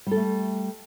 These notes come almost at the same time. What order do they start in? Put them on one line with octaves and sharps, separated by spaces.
G3 A4 A3